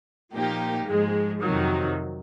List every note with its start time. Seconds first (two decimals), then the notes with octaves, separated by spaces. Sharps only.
0.33 A#2 F3 A#3 D#4 G4
0.87 G#2 F3 G#3
1.42 F2 C3 D#3 F#3